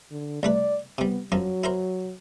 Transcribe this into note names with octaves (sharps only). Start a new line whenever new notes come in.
D3
C2 A3 B4 D5
C3 G3 B3
F#2 F3 F#3
E4 A#4 C5